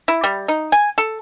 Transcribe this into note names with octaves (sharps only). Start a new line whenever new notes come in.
E4
G3
D#4
G#5
A4